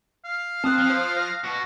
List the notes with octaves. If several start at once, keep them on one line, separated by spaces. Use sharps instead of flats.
F5
C4 A5 D#6 F#6
F3
C5
A#6
B2 F#4 A#6